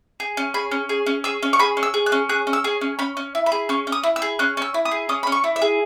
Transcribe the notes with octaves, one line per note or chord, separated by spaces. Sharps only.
G#4
C#4
G#4 B5
C#4
G#4
C#4
G#4 E6
C#4
C#6
G#4 B5
C#4
E6
G#4
F#6
C#4
G#4 F#6
C#4
E6
G#4
C#4
C#4 B5
C#4
E4
B5
G#4
C#4 C#6
C#4
D#6
E4
E6
G#4
C#4 F#6
C#4 E6
E4
D#6
G#4
C#4 D#6
B5
C#4
C#6
E4
E5
G#4